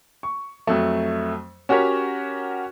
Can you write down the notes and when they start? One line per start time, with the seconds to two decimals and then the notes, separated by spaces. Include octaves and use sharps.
0.23 C#6
0.67 F2 F#3 A3
1.69 C#4 F#4 G4 A#4 C#5